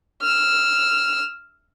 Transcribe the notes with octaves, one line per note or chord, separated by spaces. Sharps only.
E6 F6